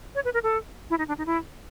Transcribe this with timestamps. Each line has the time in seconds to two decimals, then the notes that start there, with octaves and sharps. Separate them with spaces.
0.15 C#5
0.25 B4
0.34 A#4
0.43 A4
0.90 E4
0.98 D#4
1.08 D4
1.18 D#4
1.26 E4